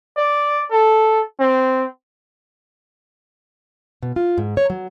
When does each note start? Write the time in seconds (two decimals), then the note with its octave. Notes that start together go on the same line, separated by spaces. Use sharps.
0.17 D5
0.71 A4
1.40 C4
4.03 B2
4.16 F4
4.38 G#2
4.57 C#5
4.70 F#3